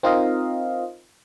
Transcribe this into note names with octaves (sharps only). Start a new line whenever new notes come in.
C4 D#4 F4 A#4 D#5 F5